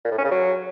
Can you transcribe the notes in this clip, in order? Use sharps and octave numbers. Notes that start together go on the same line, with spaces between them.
A#2
A2
C#4
C#3
F#3